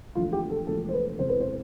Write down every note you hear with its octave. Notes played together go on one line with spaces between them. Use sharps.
E1 D2 D3 F3 F4
G4
A4
E1 D2 D3 F3 A4
C5
B4
E1 E2 C3 E3 C5
B4
C5